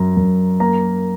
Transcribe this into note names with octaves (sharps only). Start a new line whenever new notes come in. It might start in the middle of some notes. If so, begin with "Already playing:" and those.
Already playing: F#2 F#3 A#5
F#2
A#3 A#5